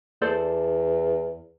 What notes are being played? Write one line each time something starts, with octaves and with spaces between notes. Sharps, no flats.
E2 A4 C5 D5